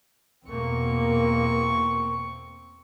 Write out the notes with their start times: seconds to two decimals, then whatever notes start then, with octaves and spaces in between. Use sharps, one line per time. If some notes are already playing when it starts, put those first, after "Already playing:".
0.46 E2 B2 A#3 C4 C#6